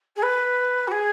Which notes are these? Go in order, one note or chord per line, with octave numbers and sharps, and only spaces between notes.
G#4
B4
F#4
G#4